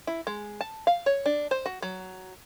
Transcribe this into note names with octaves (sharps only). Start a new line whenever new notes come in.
E4
G#3
A5
F5
C#5
D4
C5
F#4
F#3